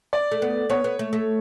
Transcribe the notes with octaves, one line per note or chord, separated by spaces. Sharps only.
D5
A3
B3
B3 C#5
B3
A3
A3